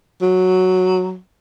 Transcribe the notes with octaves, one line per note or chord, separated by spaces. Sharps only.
F#3